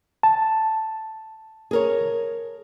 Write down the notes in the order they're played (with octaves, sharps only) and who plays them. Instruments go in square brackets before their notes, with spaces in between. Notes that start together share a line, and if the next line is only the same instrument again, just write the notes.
[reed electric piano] A5
[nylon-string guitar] G#4 A#4 C#5